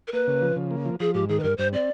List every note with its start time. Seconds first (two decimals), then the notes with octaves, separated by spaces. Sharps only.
0.08 A#4
0.13 A#3 B4
0.27 C#3
0.42 F3
0.56 C#3
0.71 A#3
0.85 F3
1.00 F3 G#4
1.14 G#2 G4
1.29 D#3 G#4
1.40 B4
1.43 G2 A#4
1.58 G2 C5
1.73 C4 D5